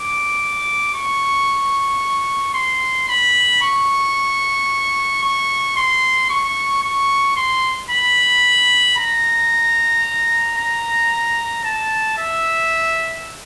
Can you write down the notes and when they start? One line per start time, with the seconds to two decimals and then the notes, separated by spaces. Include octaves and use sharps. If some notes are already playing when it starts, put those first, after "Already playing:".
Already playing: D6
0.95 C#6
2.54 C6
3.09 B5
3.62 C#6
5.23 C#6
5.77 C6
6.30 C#6
6.83 C#6
7.36 C6
7.91 B5
8.97 A#5
10.58 A#5
11.64 A5
12.18 E5